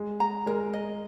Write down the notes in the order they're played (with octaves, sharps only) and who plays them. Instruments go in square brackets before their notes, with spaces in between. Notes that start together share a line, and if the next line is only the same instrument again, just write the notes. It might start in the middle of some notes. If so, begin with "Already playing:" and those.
Already playing: [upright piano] G#3
[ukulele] A#5
[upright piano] G#3 [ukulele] A#4
[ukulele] D#5